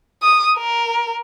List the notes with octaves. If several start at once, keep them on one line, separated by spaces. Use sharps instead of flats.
D#6
A#4